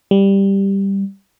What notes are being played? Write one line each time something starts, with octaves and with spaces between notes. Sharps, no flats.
G3